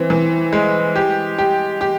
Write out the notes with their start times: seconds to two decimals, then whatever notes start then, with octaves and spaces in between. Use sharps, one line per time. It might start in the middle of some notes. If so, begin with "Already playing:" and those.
Already playing: E3 C4
0.10 E3
0.53 G#3
0.96 G4
1.38 G4
1.81 G4